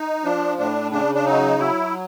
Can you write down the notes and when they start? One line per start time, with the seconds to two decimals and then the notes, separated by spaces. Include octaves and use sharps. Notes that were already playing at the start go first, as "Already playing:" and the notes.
Already playing: D#4
0.24 F3 D4
0.58 A2 D4
0.91 C#3 D4
1.15 D4
1.25 F#3 D#4
1.59 F#3 E4